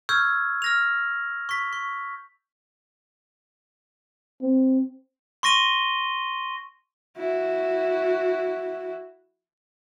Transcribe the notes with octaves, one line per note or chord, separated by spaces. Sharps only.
C#6 E6 F6 G6 G#6
F6 A#6 F7
C#6 B6
C#6
C4
C6 C#6 A#6 D#7 G7
E4 F#4